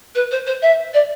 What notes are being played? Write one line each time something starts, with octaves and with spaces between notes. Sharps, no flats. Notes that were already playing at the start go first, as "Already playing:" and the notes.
B4
C5
C5
E5
D5